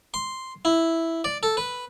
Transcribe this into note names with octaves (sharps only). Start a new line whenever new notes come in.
C6
E4
D5
A4
B4